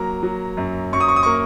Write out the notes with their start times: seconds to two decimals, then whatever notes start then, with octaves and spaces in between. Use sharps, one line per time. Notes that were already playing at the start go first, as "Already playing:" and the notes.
Already playing: F#3 A#3 A#5
0.23 F#3
0.57 F#2
0.93 F#2 C#6
1.00 D#6
1.08 C#6
1.16 D#6
1.23 A#3 C#6